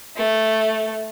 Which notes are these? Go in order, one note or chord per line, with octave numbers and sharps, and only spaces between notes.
A3